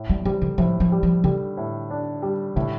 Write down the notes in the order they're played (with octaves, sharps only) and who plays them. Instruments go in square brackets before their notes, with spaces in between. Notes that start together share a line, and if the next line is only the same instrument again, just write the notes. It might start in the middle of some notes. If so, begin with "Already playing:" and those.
Already playing: [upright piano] A2
[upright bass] G3
[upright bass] F3 [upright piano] G3
[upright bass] D3
[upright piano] A2 [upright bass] F3
[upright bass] F3
[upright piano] G3
[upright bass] F3
[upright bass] D3 [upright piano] G3
[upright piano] A2
D4
G3
[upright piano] A2 [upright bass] D3